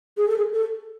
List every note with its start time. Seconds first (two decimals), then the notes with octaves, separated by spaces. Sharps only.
0.17 G#4
0.27 A4
0.38 G#4
0.52 A4